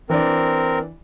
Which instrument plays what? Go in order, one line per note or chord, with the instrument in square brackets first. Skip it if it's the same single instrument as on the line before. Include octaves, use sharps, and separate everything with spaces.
[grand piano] E3 D4 D5 [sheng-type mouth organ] C4 A#4